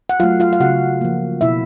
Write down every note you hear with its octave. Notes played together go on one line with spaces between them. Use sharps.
F#5
F#3 A3 F4 F5
F4 F5
F5
C#3 F#4 F#5
F3 A#3
B2 E4 E5